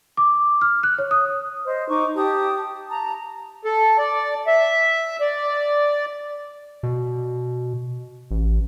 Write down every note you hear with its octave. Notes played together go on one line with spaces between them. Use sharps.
D6
F6
F#6
C#5
D#6
C5 D#5
D#4 C#6 D6
G4 A5 D#6
A5 A#5
A4
D5
E5
D5
B2
A1